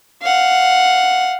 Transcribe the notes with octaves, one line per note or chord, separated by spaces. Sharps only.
F5 F#5